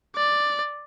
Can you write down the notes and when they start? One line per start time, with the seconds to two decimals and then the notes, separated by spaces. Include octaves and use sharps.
0.16 D5